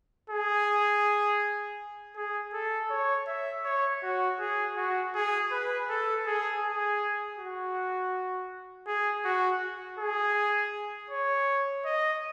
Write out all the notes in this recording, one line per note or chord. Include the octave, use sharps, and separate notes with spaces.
G#4
G#4
A4
C#5
E5
C#5
F#4
G#4
F#4
G#4
B4
A4
G#4
G#4
F#4
G#4
F#4
G#4
C#5
D#5